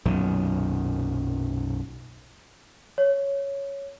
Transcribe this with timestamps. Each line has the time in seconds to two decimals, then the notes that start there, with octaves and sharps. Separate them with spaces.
0.05 B1 F#2 A#2 D#3
2.98 C#5